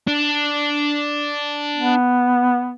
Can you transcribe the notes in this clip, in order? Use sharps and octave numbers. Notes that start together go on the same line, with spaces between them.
D4
B3